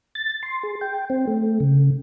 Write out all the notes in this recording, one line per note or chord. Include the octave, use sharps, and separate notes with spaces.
A6
C6
G#4
G5
C4
A3
C#3